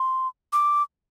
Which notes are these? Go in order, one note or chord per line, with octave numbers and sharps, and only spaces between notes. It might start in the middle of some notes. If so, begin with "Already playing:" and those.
Already playing: C6
D6